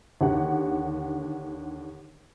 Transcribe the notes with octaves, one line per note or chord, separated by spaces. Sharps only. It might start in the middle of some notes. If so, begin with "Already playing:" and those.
D#2 D3 G4 F#5